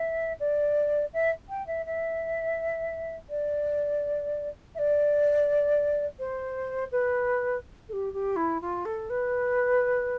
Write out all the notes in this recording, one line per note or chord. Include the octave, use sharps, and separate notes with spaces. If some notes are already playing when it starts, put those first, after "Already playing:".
Already playing: E5
D5
E5
G5
E5
E5
D5
E5
D5
C5
B4
A4
G4
G4
E4
F4
A4
B4